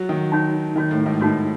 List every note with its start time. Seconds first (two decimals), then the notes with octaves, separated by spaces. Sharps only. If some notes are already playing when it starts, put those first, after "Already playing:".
Already playing: F#3
0.09 D#3
0.32 D#4 F#4 C#5
0.75 D#3 D#4 F#4 C#5
0.91 A2
1.06 G#2
1.20 A2 D#4 F#4 C#5